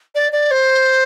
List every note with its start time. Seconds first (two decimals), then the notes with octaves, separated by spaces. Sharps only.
0.15 D5
0.32 D5
0.51 C5